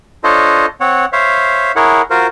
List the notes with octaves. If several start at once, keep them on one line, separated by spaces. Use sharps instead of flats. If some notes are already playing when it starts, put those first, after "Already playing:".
D4 F4 A4 C5 C#5 D#5
C4 C#5 F#5
C5 C#5 E5 F5
E4 G#4 A#4 C#5 F#5
F4 F#4 A#4 C5